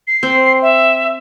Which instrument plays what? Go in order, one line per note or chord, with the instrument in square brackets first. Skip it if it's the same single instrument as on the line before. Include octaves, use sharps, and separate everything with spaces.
[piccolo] C7
[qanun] C4
[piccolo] E5